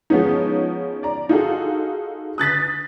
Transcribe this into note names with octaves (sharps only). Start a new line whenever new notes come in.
F3 G#3 B3 C#4 D#4
D5 A#5
D#4 F4 F#4 G#4 A4
D#6 F#6 A6 B6